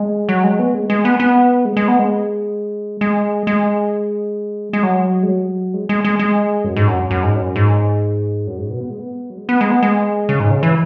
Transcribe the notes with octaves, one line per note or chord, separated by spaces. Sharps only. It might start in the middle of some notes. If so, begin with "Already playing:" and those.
Already playing: G#3
F#3
G#3
B3
G#3
G#3
B3
B3
G#3
G#3
B3
G#3
G#3
G#3
G#3
F#3
G#3
F#3
G#3
G#3
G#3
G#3
F#2
G#2
F#2
F#2
G#2
F#2
G#2
F#2
G#2
B2
B3
G#3
B3
F#3
G#3
B3
G#3
B3
G#3
C#3
G#2
C#3
E3